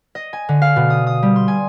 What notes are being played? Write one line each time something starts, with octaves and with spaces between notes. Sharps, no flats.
D#5
G#5
D3
F5
B2
D#6
D#6
G3
C6
G#5